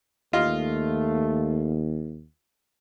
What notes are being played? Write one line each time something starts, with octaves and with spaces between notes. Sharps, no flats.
D#2 A3 F4 D#5